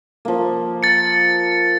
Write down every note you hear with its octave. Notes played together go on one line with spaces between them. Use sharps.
F3 A#3
A6 C#7